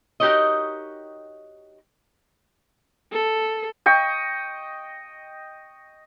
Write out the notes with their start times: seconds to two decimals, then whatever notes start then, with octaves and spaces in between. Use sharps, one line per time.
0.20 D#4 F#4 G4 A#4 C#5 D#5
3.12 A4
3.86 D#5 G5 C#6